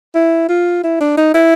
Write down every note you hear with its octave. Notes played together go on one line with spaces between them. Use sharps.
E4
F4
E4
D4
D#4
E4